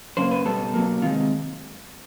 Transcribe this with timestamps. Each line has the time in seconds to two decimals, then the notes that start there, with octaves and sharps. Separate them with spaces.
0.17 F#2 C#3 A#3 C5
0.31 B4
0.45 B2 G3 B3 A4
0.74 B2 F#3 A#3
1.02 C3 D#3 G#3 F4